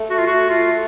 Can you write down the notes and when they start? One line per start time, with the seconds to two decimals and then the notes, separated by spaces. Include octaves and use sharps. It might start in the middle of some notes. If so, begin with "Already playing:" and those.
Already playing: A3
0.10 F#4
0.18 F4
0.27 F#4
0.50 F4